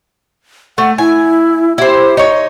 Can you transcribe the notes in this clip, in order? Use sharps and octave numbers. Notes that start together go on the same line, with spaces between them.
A3 F#5
E4 G#5
E4 G4 C5
D#4 C#5